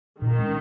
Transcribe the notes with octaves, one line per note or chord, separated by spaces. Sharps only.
A#2 D#3
G#3 C#4